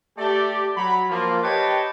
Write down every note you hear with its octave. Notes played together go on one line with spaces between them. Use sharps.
A3 G4 D5
F#3 B5
F3 A#3 F4
G4 B4 C#5 D#5 G5 A5